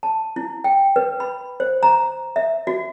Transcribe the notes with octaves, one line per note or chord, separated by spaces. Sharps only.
A5
E4
G5
B4
B5
C5
A#5
E5
F#4